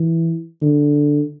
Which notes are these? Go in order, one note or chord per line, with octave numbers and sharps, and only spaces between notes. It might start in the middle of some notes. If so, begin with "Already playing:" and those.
Already playing: E3
D3